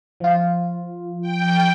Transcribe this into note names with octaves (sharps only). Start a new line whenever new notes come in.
F3 F4
G5